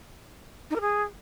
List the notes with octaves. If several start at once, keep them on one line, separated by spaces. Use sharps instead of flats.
D#4
A#4
G#4